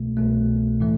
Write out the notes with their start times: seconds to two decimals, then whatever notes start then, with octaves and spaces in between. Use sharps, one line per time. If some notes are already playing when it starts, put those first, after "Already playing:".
Already playing: C2 B2 A3
0.17 C2 B2 A3
0.80 A2 E3 A3